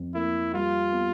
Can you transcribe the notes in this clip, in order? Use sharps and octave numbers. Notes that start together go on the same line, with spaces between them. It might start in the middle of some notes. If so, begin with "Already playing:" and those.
Already playing: F2 F3
A#3 E4
G3 F4
B3